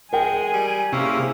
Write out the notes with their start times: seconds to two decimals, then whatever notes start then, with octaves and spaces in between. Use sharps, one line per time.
0.13 G#3 A#4 G5 G#5
0.54 G3
0.93 C3 A#3 C#4 E4 G4 G#4